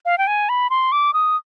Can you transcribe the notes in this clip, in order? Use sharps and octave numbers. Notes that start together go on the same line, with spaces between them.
F5
G5
G#5
B5
C6
D6
D#6